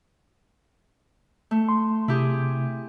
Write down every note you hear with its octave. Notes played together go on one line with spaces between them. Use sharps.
A3
C6
C3 E4 G4 G#4